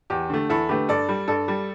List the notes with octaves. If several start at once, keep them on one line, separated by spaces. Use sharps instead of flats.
E2 G4
D3 A3
E2 E4 A4
D3 A3 G4 B4
G2 A4 D5
G3
G2 A4 D5
G3